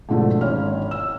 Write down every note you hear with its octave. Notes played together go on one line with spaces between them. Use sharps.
G#2 B2 D3 F3 A3
G#1 A#3 C#4 F6
E6